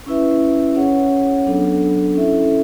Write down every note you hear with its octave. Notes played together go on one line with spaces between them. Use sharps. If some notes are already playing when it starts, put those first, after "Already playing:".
C#4 E4 B4 E5
C#4 G#4 C#5 F#5
F#3 B3 D4 A4
C#4 E4 A4 E5